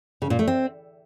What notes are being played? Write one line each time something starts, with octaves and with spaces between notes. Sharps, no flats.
C#3
A#2
A3
C4